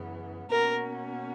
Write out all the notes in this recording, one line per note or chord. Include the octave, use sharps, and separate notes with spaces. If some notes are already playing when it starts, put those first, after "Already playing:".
Already playing: F#2 C#3 E3 B3
B2 A#3 C#4 F#4 A#4